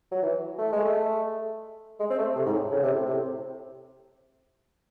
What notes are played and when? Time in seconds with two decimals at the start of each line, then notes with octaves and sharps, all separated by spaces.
0.12 F#3
0.23 E3
0.58 A3
0.72 G#3
0.85 A3
2.00 G#3
2.10 C4
2.18 A3
2.36 C3
2.46 G#2
2.53 A2
2.71 C#3
2.83 C3
2.93 A2
3.05 C3